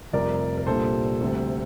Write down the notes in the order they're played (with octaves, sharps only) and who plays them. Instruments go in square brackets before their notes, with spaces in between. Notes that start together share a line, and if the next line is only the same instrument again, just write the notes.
[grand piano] F1 F2 C3 G3 A#4 D5
A#4
C2 A#2 G3 D4 A4 C5
D2 C3 G3